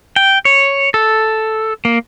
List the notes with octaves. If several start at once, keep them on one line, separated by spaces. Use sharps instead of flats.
G5
C#5
A4
A#3